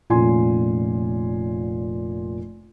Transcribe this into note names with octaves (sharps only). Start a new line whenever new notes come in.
F1 A#2 C#4 F4 G#5 C6